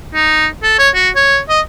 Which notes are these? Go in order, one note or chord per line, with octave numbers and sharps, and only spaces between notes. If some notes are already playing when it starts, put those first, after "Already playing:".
D#4
A4
C#5
F#4
C#5
D#5